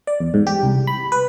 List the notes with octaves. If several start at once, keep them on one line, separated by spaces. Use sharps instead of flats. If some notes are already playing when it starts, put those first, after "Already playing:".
D5
E2
G#2
G4
C2
B5
B4